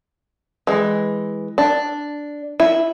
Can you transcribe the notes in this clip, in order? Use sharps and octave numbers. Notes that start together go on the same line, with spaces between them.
E3 G#3
D4
E4